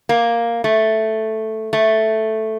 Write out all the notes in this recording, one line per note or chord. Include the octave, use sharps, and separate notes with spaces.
A#3
A3
A3